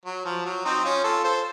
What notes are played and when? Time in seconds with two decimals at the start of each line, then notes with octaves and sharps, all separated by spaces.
0.05 F#3
0.25 F3
0.45 F#3
0.65 C4 D#4
0.84 C#4 F4
1.04 F4 A4
1.24 A4 C5